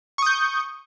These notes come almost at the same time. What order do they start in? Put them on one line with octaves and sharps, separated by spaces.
C#6 D#6 G6